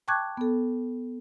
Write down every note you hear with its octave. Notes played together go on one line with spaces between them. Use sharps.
G5 A5 C#6 D6 F#6 G#6
B3 A4